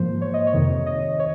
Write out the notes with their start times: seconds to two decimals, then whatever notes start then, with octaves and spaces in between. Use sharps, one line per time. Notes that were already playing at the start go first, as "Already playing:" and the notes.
Already playing: G#2 F3 A#3 C5
0.21 C#5
0.34 D#5
0.47 C#5
0.53 F2 C3 D#3
0.86 D#5
1.19 C#5